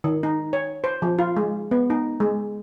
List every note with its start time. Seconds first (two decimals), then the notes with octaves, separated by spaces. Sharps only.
0.04 D#3
0.23 D#4
0.53 C#5
0.84 C5
1.02 F3
1.19 F4
1.37 G#3
1.71 B3
1.90 D#4
2.20 G#3